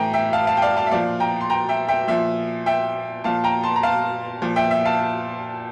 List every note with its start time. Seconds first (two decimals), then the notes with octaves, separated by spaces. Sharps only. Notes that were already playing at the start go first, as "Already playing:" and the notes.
Already playing: A2 E3 G5 A#5
0.13 E5 G5
0.33 F5 A5
0.47 F5 A5
0.57 G5
0.62 D5 F5
0.77 F5 A5
0.87 E5
0.91 A#2 F3 D5 F5
1.20 G5 A#5
1.41 C6
1.50 G5 A#5
1.69 E5 G5
1.88 E5 G5
2.08 A#2 F3 E5
2.66 E5 G5
3.24 A#2 F3 F5 A5
3.44 G5 A#5
3.63 A5 C6
3.76 A#5
3.83 F5 A5
4.42 A#2 F3
4.56 E5 G5
4.71 E5
4.85 F5 A5